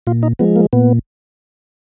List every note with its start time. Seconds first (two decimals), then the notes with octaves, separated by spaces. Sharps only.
0.07 A#2 F4
0.23 D#4
0.39 F3 G#3 B3
0.56 A#3
0.73 A#2 B3